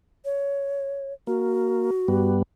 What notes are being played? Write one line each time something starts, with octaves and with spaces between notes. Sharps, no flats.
C#5
A#3 F#4
G2 G3 B3